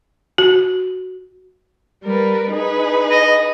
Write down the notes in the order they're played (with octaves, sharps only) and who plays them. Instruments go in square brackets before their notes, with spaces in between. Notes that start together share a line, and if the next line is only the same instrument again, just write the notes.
[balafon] F#4
[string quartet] G3 A#4 B4
D#4 G#4 B4
[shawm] D#5